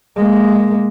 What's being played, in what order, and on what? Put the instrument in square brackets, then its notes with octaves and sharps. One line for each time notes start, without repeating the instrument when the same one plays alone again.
[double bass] G#3 A#3